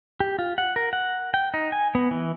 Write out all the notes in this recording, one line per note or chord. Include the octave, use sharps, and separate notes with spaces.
G4
F4
F#5
A#4
F#5
G5
D#4
G#5
B3
E3